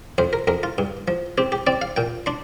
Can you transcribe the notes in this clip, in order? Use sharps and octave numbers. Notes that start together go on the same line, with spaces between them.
F2 C5
A#4
F2 A#4
F4
G2
F3
C4 G4
G4
C4 D5
F5
A#2 G5
D4 C6